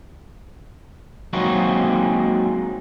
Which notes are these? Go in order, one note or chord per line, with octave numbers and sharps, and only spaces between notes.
F#3 G#3 A#3 C4 D#4 F#4